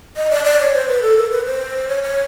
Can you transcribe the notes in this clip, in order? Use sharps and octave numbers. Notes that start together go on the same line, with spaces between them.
D#5
D5
D5
C#5
C5
B4
A4
A#4
B4
C5
C#5
C#5